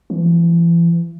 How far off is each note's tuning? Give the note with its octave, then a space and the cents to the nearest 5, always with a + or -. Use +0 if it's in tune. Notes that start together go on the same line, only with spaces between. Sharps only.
E3 +40